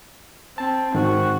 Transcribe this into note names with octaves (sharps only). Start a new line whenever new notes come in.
C4 A5
G#2 D#3 C4 F#4